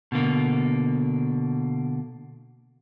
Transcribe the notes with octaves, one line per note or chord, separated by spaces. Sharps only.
B2 D3 A#3